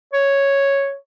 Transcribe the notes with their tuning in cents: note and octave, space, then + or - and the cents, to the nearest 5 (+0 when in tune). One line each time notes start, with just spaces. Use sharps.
C#5 +0